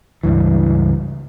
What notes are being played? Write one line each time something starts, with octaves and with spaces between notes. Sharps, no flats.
C#2 G2 E3